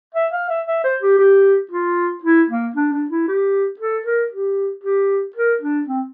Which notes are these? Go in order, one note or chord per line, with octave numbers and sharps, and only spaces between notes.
E5
F5
E5
E5
C5
G4
G4
F4
E4
A#3
D4
D4
E4
G4
A4
A#4
G4
G4
A#4
D4
C4